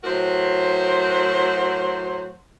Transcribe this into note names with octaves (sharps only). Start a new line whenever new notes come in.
A2 F#3 F#4 A#4 C5